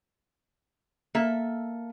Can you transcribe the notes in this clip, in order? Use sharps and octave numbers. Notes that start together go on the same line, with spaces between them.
A#3 A4 E5